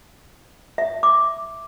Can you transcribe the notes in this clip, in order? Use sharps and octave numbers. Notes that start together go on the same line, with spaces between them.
E5
D6